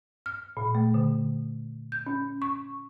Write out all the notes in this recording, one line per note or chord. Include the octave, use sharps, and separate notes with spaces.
F6
A#2
A3
D3
G6
C#4
C#6